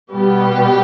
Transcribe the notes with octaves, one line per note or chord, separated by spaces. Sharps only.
B2 G3 B3 G4